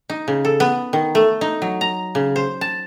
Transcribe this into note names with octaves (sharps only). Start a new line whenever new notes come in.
D#4
C#3
A4
B3
D#3
A3
D#4
F#3
A#5
C#3
C5
A5